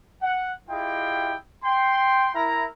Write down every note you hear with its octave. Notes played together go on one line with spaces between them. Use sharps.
F#5
E4 F4 G4 G#4 D#5 G5
G5 C6
E4 A#4 A#5